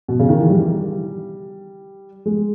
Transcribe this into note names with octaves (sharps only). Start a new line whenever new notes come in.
B2
C#3
D#3
E3
G3
G#3